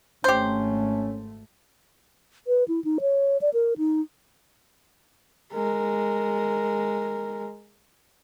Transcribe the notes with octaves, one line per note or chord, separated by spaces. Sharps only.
G#1 A3 C#4 G4 C5
B4
E4
D#4
C#5
D5
A#4
D#4
G#3 A#4